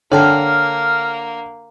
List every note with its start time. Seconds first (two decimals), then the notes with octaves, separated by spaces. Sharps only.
0.12 D3 A#3 C#5 G5 A5 F6